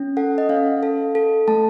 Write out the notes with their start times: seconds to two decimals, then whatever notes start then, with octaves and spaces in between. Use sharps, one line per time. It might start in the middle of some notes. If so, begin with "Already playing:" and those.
Already playing: C#4
0.17 A4 F#5
0.38 D#5
0.49 C#4 F5
0.83 A4
1.15 A4
1.48 A3 A5